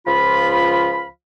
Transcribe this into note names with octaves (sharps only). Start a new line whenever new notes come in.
C#2 F3 F4 F5 B5